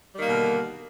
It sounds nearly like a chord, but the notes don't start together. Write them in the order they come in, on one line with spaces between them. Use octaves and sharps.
G3 D#3 A#3 B2 D3